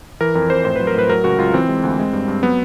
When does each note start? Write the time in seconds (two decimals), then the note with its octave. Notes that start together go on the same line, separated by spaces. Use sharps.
0.21 E3 A#4
0.35 F2 A#4
0.50 F2 C5
0.65 A2 C5
0.76 F#3 B4
0.87 A#4
0.95 A2 B4
1.09 F#3 A#4
1.24 C#2 F#4
1.38 C#2 F4
1.54 E3 C4
1.69 G#3
1.83 D2
1.99 G#3
2.13 G2
2.28 G2
2.43 F#3 B3